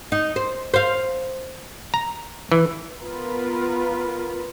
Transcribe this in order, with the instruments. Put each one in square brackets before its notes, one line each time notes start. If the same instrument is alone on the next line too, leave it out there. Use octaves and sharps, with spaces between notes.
[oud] D#4
C5
C5 F5
[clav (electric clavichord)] A#5
E3
[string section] B3 F4 A#4 B4